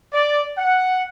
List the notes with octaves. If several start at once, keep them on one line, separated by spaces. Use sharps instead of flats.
D5
F#5